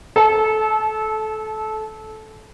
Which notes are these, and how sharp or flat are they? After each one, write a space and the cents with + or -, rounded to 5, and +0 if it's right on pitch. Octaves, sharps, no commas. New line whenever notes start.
A4 -20 A5 -40